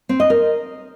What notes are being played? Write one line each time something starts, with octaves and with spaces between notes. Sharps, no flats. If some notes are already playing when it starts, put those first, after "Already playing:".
C4
D#5
A#4